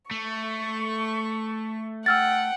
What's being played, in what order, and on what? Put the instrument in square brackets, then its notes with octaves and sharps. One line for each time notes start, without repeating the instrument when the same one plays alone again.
[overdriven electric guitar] A3 [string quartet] C#6
[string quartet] F#5 G5 [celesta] E6 F6 A6